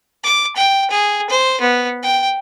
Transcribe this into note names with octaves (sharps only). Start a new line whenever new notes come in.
D6
G5
G#4
C5
B3
G5